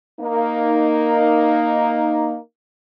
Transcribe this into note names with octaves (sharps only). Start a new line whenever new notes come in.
A#3 D#4